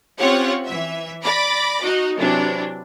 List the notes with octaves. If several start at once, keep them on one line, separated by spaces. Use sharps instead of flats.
C4 C#4 F4 G4 C#5 F#5
E3 E5
D5 B5 D6 A#6
D#4 F#4 D#5
C3 E3 F#3 D4